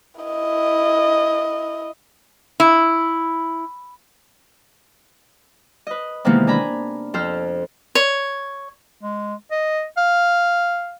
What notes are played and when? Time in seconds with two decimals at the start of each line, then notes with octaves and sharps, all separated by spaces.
0.21 E4 D#5
2.60 E4
5.87 B4 D#5
6.25 C3 D#3 E3 G#3 A#3 B3
6.47 D4 G#5 A#5 B5
7.14 F2 A4 C5 F6
7.95 C#5
9.02 G#3
9.51 D#5
9.97 F5